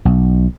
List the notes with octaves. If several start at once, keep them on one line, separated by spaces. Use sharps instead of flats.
B1